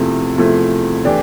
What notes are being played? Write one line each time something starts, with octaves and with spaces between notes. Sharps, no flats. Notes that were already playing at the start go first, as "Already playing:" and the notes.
Already playing: E2 C3 F3 A3 E4
E2 C3 F3 A3 E4
E3 A3 D4 G4